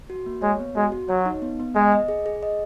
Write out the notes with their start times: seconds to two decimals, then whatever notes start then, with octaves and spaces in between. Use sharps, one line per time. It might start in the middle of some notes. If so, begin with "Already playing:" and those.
0.10 F#4
0.26 A#3
0.42 G#3 C#5
0.59 B3
0.76 G#3 F#4
0.92 F#4
1.09 F#3 C#5
1.26 D#4
1.42 B3
1.60 B3
1.75 G#3 D#5
1.92 D#5
2.08 G#4
2.26 G#4
2.43 D#5